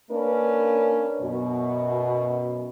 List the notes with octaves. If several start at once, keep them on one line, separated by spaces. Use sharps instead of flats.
A#3 C#4 D4 A#4 B4
F#2 B2